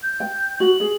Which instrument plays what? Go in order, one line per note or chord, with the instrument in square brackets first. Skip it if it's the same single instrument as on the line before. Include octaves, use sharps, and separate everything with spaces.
[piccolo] G6
[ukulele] G5
[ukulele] F#4 [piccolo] F#7
[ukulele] G#4